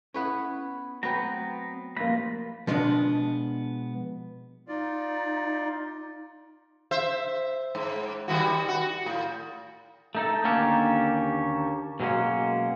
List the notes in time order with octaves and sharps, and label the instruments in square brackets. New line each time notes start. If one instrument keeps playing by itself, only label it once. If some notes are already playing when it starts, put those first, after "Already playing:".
[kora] B3 B4 C#5 [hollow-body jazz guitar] C#4 E4 E5
[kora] F#3 B4 [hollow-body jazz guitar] A3 G5 [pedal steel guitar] B3 C4 A#5
[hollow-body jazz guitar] F3 G3 A3 [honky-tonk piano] A#3 A#6 [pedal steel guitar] F4 B5
[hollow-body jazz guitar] B2 F3 G#3 B3 C#4 D4
[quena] D#4 [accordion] F4 D5
[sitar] C5 E5
G#2
D#3 G3 F#4
F#4
A2
[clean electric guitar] A3 D#4 A4
D#2 D3 A#3 C#4 G4 A4
B2 F#3 G#3 A#3 C#4